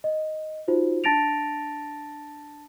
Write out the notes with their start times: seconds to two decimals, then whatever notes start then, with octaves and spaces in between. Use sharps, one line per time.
0.04 D#5
0.68 D#4 F4 F#4 C5
1.04 D4 A5 A6 A#6 D7 F7